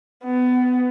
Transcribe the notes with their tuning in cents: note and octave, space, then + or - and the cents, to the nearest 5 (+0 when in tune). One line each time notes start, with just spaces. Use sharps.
B3 +20